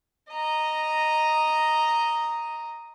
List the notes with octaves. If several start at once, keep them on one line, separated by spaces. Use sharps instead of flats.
D#5 A#5